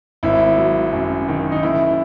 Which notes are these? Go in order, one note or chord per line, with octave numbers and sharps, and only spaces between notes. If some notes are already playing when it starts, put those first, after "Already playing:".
G#1 E4
F#3
F#2
D#3
D#4
F#1 E4